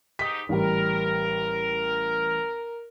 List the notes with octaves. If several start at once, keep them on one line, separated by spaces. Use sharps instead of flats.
G#2 D#4 G4 D#6 B6
A1 G3 A#4